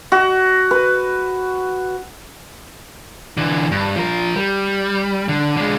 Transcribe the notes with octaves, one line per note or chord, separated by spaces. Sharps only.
F#4
B4
D3 E3
G2
F3 A#4
G3
D3
D3 G#3